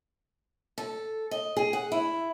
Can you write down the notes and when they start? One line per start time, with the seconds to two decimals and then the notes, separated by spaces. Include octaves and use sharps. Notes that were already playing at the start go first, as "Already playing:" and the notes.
0.78 A4
1.31 D#5
1.57 G#4
1.73 F#5
1.92 E4